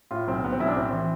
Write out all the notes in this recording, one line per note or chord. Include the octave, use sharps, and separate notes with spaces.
A2 F4
B1 C4
B1 B3
C4
B1 E4
D4
A2 C4
E3